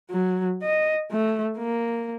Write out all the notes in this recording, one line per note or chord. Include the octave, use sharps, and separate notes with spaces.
F#3
D#5
A3
A#3